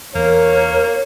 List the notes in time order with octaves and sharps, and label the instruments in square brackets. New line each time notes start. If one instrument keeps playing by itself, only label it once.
[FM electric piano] E2 [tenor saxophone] A#3 [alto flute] A#4 [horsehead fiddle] C#5